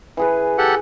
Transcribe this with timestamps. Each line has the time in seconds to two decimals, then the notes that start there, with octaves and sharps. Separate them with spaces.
0.17 E3 G#4 B4
0.58 G4 A4 F#5